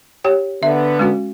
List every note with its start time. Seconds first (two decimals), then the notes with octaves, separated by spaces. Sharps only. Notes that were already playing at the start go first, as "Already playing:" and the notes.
0.24 G4 C#5 G5
0.63 D3 B3 E5
0.99 G#3 C#4 F#4